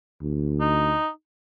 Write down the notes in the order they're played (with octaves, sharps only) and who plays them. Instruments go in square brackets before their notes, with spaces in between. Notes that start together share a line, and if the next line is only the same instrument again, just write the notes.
[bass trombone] D2
[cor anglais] D#4